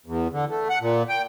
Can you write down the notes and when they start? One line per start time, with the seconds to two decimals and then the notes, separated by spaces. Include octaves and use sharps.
0.06 E2
0.32 D3
0.50 A3
0.70 F#5
0.81 A#2
1.09 G5